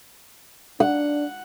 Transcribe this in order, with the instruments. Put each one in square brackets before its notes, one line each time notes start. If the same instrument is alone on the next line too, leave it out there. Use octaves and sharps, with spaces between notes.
[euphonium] D4 [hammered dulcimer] F#5